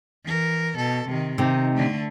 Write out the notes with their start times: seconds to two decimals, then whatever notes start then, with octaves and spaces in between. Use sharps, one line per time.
0.25 E3 A#4
0.77 B2 A4
1.08 C3 D#3
1.38 C3 D#3 D#4
1.75 D3 A3